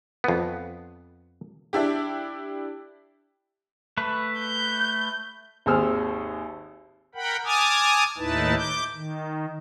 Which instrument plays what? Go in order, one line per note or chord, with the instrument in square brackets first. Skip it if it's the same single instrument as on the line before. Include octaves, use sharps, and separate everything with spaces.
[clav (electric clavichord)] F2 B3
[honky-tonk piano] D4 E4 G4
[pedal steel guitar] A3 B4
[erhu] G6
[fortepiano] G#1 D#2 G#4 C5 E6 F6
[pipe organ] A#4 F#5 G5 B5
G#5 A5 D6 D#6 F6 G#6
D#2 A2 D#4 E4 B4 A5
D6 G6
D#3